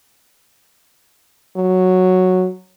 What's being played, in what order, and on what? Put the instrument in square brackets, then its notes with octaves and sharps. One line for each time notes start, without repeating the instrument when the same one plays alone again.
[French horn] F#3